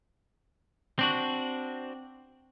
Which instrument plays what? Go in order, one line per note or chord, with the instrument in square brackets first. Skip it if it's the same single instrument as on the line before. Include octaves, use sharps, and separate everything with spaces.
[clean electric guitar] C4 D4 F#4